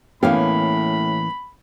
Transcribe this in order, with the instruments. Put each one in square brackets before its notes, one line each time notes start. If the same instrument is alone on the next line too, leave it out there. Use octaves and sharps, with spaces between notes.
[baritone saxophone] A2 [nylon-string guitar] E3 A#3 C#4 [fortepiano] B3 F5 G5 [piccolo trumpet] B5